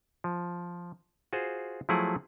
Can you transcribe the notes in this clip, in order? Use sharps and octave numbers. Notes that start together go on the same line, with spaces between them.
F3
F4 F#4 G#4 C5
F3 F#3 A3 E4 G#4 F#5